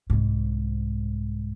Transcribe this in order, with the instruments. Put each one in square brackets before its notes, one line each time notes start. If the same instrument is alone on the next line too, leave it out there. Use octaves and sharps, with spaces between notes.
[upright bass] C2 G#2